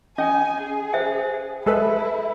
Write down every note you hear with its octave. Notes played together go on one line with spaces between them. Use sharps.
C#4 D#5 G5 G#5
G#4
C5 E5 G5
G#3 E4 A4 B4